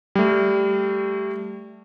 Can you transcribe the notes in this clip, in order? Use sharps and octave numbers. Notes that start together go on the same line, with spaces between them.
G3 A3